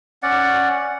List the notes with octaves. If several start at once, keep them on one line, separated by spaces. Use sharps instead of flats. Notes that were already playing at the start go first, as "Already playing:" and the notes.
C#4 D5 F#5